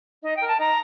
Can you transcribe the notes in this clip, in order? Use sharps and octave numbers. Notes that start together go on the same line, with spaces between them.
D#4 D#5
G5
A#4
A5
D#4 A#5